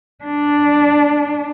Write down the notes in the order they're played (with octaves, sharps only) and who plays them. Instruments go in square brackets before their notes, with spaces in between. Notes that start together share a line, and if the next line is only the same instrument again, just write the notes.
[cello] D4